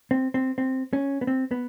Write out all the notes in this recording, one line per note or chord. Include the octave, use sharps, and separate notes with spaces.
C4
C4
C4
C#4
B3
C4
B3